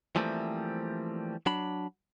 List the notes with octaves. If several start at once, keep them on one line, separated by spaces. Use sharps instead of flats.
E3 F3 G3 A3 A#3 C4
F#3 D4 B5